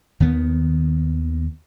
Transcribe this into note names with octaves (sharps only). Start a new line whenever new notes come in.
D#2 D#3 B3